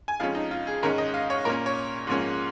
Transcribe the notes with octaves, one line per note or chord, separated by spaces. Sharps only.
G#5
F2 F3 G#3 C#4 F5
D#4
F4
G#4
G#2 D#3 G#3 C#4 A#4
D#5
F5
C#5
A#2 A#3 C#4 A#4
C#5
G#2 F3 A#3 C#4